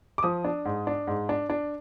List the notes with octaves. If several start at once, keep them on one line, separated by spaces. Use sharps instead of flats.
D6
F3 D#6
D4
G#2
D4
G#2
D4
D4